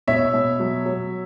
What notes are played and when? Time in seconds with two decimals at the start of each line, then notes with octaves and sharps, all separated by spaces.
0.07 B2 C#5 E5
0.34 B2
0.60 F#3
0.86 F#3